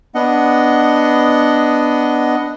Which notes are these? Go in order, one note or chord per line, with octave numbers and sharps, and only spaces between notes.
B3 D4 D#5 F#5